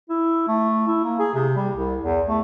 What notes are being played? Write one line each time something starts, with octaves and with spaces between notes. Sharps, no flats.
E4
A3
E4
A#3
G#4
C3
G3
C2
E2
A3